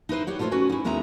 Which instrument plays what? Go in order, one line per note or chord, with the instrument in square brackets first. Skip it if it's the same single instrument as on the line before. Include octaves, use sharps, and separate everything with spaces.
[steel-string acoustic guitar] D#4 E4 B4 C5
G4 C#5 F#5
A3 B3 F4 G4 C5 C#5
C#4 F#4 B4 G#5
D#4 E4
D#2 G#3 B3 D#4 E5 A#5